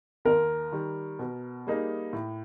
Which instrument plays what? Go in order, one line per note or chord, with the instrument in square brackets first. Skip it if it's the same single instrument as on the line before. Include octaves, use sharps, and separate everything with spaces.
[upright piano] D#2 [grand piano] A#4
[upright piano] D#3 G3
B2
G3 A#3 D#4 G#4
A2